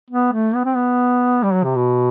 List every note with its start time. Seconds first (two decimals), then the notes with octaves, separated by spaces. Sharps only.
0.11 B3
0.33 A3
0.55 B3
0.65 C4
0.75 B3
1.43 G3
1.53 F#3
1.64 C3
1.76 B2